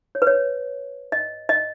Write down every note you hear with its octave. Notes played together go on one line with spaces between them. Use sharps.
C#5
B4
C#5
D#5
D#5